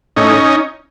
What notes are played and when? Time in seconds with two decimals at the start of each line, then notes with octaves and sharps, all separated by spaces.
0.16 A2 C#4 D#4